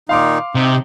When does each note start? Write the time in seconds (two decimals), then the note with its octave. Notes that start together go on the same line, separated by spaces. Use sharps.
0.09 A#2 D#3 D#4 F5 C6 D6
0.55 C3 D#4